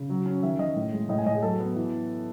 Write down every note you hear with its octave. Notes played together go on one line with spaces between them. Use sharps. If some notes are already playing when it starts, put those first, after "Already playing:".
Already playing: C#3
F#3
C#4
D#3 E5
D#3 D#5
A2
G#3
A2 D#5
G#5
A2 D#5
G#4
F#3 A4
B3
E3